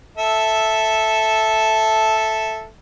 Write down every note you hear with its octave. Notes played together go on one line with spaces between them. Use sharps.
A4 E5